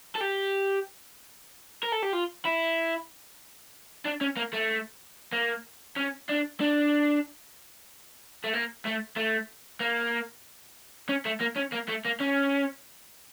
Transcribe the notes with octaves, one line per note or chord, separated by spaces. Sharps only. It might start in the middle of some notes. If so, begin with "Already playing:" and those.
A4
G4
A#4
A4
G4
F4
E4
D4
C#4
A#3
A3
A#3
C#4
D4
D4
A3
A#3
A3
A3
A#3
C#4
A3
A#3
C#4
A#3
A3
A#3
C#4